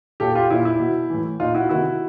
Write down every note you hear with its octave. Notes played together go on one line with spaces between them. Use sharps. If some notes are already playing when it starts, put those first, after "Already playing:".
A#2 G4 A4
F4 G4
A#2 E4
E4
B2
A2 E3
A#2 D#4 F4
E4 F#4
C3 D#3 E4 F#4